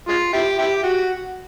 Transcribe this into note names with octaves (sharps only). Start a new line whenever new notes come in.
G#3 F4
E4 G4
E4 G4
F#4